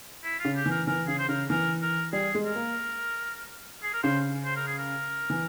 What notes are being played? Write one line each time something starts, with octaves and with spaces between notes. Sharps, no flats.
E4
F4
C#3
G4
E3
A#4
E3 A#4
C#3 G#4
C5
C#3 A#4
E3 A#4
A#4
G3 G#4
G#3
A#4
A#3
G#4
A#4
C#3 C5
C5
A#4
G#4
A#4
E3